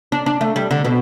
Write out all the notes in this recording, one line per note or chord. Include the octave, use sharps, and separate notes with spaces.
D4
D4
A3
G3
D3
B2